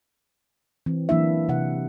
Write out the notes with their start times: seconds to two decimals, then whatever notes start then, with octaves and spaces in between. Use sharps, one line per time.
0.86 E3 C4
1.09 E3 F#3 A#3 D4 E4 E5
1.49 C3 F#5